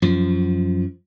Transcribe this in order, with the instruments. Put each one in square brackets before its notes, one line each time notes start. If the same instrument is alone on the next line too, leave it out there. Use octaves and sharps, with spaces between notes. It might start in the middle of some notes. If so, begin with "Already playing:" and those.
[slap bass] F#2 F3